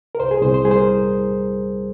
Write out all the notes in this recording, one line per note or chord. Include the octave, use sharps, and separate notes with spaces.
A#4
C2 C5
G#4
C2 C5
C5
G3 G#4
C5
A#4